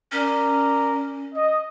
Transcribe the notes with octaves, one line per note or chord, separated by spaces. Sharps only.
C#4 A#4 D5
D#5